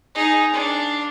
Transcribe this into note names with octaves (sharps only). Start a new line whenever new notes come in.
D#4 G#4
D4 F5